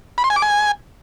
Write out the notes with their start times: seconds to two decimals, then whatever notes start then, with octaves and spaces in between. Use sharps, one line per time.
0.18 B5
0.24 C6
0.30 G#5
0.36 D6
0.42 G#5